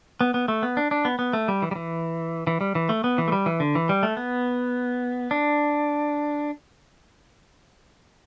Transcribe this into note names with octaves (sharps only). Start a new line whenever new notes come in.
B3
B3
A3
B3
D4
D4
B3
B3
A3
G3
E3
G3
E3
E3
G3
E3
A3
B3
E3
A3
G3
E3
D3
E3
G3
A3
B3
D4